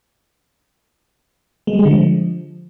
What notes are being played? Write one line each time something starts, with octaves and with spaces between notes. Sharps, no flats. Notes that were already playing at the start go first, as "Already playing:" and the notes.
G#3
G3
G#3
D3
F3